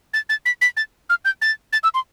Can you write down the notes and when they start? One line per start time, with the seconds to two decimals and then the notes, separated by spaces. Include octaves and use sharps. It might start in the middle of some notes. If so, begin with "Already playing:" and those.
0.14 A6
0.29 A6
0.46 B6
0.61 B6
0.77 A6
1.10 F6
1.25 G6
1.42 A6
1.73 A6
1.83 E6
1.94 C6